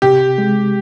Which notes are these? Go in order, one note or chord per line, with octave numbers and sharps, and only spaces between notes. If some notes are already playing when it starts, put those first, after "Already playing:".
C3 G4
G#3